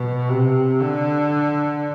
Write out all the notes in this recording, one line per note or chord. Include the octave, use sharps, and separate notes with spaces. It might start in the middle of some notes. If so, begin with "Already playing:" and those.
Already playing: B2
C3
D3